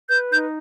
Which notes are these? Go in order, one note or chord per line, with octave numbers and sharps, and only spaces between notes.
B4 G6
D#4 G6